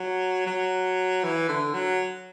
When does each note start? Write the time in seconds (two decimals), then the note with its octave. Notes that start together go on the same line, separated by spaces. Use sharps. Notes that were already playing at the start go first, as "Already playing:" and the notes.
Already playing: F#3
0.46 F#3
1.24 E3
1.49 D3
1.74 F#3